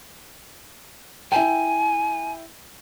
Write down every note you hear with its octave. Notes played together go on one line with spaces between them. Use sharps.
E4 G5 G#5